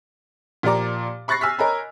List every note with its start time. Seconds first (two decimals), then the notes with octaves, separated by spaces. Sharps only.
0.63 A#2 F3 G4 D5 A#5 D6
1.28 B5 C#6 F#6 A6 A#6 C7
1.41 G#5 E6 F6 B6
1.58 A#4 C#5 D#5 G#5 A#5 B5